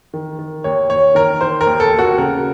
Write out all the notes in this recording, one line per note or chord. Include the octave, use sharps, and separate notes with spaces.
D#3
D#3
D#2 C#5
D#2 C#5
D#3 A#4
D#3 C5
A#4
D#2
A4
D#2
F#4
C#3 A#4